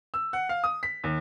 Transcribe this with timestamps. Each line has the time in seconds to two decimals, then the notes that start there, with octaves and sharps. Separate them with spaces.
0.14 E6
0.33 F#5
0.49 F5
0.64 D#6
0.83 B6
1.04 D#2